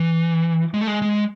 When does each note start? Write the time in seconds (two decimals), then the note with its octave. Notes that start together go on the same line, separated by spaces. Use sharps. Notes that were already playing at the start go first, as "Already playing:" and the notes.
Already playing: E3
0.74 G#3
0.81 A3
0.87 G#3
1.02 G#3